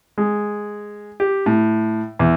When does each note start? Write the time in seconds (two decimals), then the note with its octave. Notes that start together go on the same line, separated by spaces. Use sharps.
0.18 G#3
1.20 G4
1.46 A2
2.19 E2